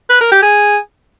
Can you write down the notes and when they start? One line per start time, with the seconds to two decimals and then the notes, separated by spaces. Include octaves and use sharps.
0.10 B4
0.21 A#4
0.32 G4
0.43 G#4